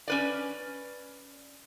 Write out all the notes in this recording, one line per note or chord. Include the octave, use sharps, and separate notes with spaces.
C#4 B4 D5